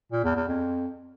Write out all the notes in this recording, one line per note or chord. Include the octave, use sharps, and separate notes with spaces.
A#2
E2
E2
F2